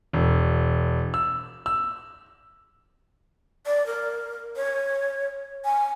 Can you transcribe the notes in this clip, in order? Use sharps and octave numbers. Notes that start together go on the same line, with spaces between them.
E1
E6
E6
D5
A#4
C#5
G#5